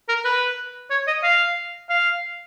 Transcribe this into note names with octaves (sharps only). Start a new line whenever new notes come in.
A#4
B4
C#5
D#5
F5
F5